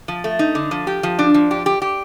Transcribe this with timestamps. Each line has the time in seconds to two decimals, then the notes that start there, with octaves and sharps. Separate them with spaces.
0.08 F3
0.24 A3
0.39 D#4
0.55 D3
0.71 F3
0.87 G4
1.03 F3
1.19 D4
1.34 F3
1.51 G4
1.66 G4
1.82 G4